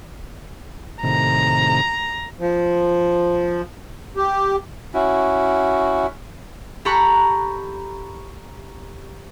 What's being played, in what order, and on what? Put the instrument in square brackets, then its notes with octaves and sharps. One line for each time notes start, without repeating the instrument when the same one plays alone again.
[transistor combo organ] A2 C3 D#3 [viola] A#5
[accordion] F3
G4
[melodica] C#4 E4 F#4
[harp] G4 A4 A#5 B5 C#6 F#6